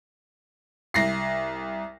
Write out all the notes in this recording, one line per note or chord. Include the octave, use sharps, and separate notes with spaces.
C2 A#6 C7